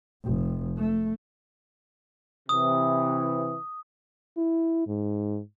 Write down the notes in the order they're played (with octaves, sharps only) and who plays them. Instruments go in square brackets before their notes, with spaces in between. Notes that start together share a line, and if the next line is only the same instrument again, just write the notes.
[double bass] F1
A3
[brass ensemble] C3 E3 [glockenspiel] D#6
[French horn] E4
G#2